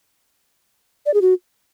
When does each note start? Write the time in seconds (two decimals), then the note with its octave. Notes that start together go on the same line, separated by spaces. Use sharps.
1.06 D5
1.14 G#4
1.22 F#4